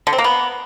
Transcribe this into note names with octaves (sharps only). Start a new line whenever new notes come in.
D3
C4
A#3
B3